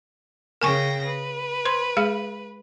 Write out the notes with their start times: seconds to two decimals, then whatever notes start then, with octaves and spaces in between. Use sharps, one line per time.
0.61 C#3 A#4 G5 G#5 C#6 A#6
1.04 B4
1.65 C5 C6
1.97 G#3 G#4 F5